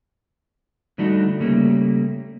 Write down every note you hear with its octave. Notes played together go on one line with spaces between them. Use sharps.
D3 G3 A3 D4 D#4 F#4
C#3 G3 A3 A#3